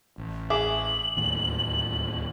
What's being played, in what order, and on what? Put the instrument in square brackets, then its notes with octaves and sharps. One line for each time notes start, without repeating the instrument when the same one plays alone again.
[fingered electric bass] A1
[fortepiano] G#4 E5 D6 [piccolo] F#7
[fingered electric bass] D1 D#2 A2